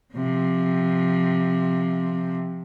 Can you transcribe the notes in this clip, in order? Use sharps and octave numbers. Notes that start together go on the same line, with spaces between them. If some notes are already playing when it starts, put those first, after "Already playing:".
C3 F3